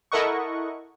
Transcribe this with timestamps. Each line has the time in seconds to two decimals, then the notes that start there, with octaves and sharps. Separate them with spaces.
0.12 E4 A4 A#4 D#5 F#5 C#6